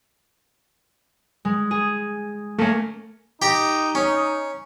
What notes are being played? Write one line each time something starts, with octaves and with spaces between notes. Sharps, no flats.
G#3
G#4
A3 A#3 C#4
D#4 G4 A#5
C#4